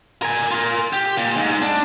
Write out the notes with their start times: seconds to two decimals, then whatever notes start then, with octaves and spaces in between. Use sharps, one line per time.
0.22 A#4 G#5
0.51 F4 A#4
0.93 G4
1.17 A#2
1.36 G#2
1.62 D4